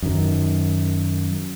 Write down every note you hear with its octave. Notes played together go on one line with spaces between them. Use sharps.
F#2 D#3